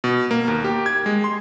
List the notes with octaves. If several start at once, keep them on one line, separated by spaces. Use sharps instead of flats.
B2
A#3
D#2
G4
G#6
G#3
C6